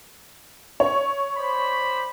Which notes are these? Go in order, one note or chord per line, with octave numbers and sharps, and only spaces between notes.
C#5
C5 D5 B5